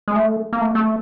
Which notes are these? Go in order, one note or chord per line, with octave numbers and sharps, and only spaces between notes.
G#3
A3
A#3
A3
A3